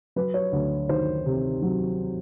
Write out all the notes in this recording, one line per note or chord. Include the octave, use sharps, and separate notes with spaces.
F#3 B4
C#5
D2
D#3 C5
C3
F#3